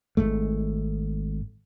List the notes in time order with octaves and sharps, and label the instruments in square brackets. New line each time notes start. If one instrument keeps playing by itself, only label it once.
[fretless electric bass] G#1 G#2 A3